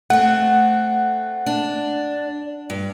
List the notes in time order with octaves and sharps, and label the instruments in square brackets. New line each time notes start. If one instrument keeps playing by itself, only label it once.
[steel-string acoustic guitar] A3 C4 [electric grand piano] F#5
[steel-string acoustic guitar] D4
G2